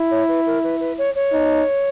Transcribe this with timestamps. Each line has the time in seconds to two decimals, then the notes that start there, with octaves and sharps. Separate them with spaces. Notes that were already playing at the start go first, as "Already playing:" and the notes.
Already playing: E4
0.11 C#5
0.28 B4
0.46 A#4
0.63 B4
0.80 B4
0.98 C#5
1.15 C#5
1.32 D#4